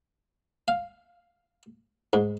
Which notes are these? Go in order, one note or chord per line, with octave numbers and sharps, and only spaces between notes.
F5
G#2